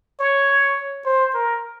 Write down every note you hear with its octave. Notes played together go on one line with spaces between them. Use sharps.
C#5
C5
A#4